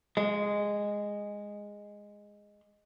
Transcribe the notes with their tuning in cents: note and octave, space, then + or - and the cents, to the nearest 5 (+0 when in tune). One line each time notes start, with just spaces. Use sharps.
G#3 -10